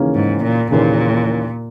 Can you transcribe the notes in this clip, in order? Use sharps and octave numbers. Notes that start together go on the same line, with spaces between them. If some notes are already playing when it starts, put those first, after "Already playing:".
Already playing: D#2 C#3 E3 A#3 C#4
G#2
A#2
D#2 A#2 C#3 E3 A#3 C#4